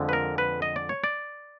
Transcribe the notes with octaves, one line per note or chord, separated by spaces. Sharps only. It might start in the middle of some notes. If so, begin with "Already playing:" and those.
Already playing: F2 D3 F3 G#3
B4
A#4
B4
D#5
D5
C#5
D5